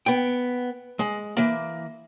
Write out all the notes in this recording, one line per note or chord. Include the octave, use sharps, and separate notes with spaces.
B3 G5
G#3
E3 A#3